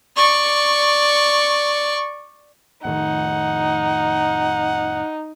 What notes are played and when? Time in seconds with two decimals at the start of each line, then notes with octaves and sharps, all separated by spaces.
0.17 D5 C#6
2.85 F1 A2 D#3 D#4 F#5